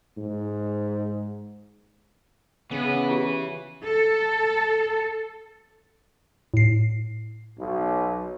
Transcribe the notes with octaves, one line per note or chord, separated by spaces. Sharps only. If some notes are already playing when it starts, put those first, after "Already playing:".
G#2
C#3 E3 B3 B4
F4 G4
A4
A2 C7
B1